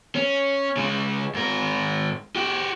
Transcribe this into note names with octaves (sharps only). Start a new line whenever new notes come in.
C#4
C#3 G#3
G#2 A#4
F#4 G4